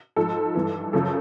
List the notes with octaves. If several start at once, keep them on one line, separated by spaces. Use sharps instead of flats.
G#2 F3 A4
G2 E3
F#2 C#3 F3 A4